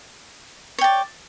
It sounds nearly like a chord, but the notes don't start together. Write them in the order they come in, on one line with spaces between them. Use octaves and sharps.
C#5 G5 D5